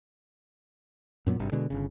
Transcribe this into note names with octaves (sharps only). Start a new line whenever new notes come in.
F#2 A#2 F#3 B3
G#1 G2 C3
B2 D3 G#3
G1 C#3